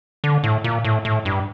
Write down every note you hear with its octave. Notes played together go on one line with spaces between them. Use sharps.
D3
A2
A#2
A2
A2
G2